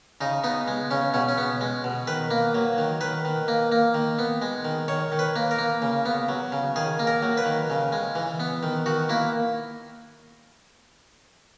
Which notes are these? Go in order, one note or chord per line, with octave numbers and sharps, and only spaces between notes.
C#3 D#4
B3 D#4
G#3
C#3 C#4
B2 C#4
C#4
B3
G#3
B2
D#3 B4
A#3
F#3
D#3
D#3 B4
D#3
A#3
A#3
D#3
B3
G#3
D#3
D#3 C#5
D#3
B4
A#3
A#4
A#3
C#3
B3
F#3
C#3
D#3 G#4
A#3
A#4
F#3
B4
D#3
C#3
G#3
E3
B3
D#3
D#3 F#4
A#3 E4